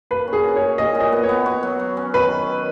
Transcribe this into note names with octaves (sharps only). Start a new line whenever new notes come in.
A#3 B4
C#4
G#4
F#4
C#4 C#5
A#2 D#5
A#2
D#5
B3
C#5
B3
F#4
F#3
F#3
C#4
D#3 B4
D#3
D#3